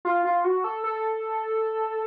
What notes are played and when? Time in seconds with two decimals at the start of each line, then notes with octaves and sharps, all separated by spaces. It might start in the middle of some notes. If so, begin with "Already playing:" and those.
0.05 F4
0.25 F4
0.44 F#4
0.64 A4
0.84 A4